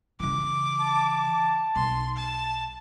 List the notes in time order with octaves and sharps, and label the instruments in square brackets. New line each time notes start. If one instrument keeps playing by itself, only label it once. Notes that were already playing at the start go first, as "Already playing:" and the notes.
[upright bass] C#3 E3 [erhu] D6
[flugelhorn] A5
[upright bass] B1 [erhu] C6
[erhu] A5